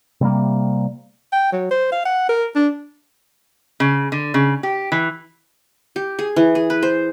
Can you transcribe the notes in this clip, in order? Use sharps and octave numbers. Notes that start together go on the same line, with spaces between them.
C3 G3 A#3
G5
F#3
C5
F5
F#5
A#4
D4
C#3
D3
C#3
G4
E3
G4
G#4
E3
G#4
B4
C5